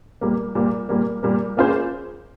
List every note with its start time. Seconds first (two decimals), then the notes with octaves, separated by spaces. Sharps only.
0.21 A#2 G3 A#3
0.55 A#2 G3 A#3
0.89 A#2 G3 A#3
1.23 A#2 G3 A#3
1.57 A#3 C#4 F4 G#4 C5